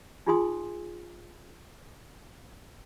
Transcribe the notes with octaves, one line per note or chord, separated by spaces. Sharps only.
D#4 F4 G#4 G#5 C6 D#6